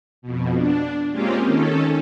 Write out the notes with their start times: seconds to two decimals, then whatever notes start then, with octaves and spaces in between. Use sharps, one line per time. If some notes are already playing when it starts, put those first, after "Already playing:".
0.22 F2 B2
0.56 D4
1.12 G#3 A#3 C4 C#4 F4 G4
1.45 D#3 C#4 A4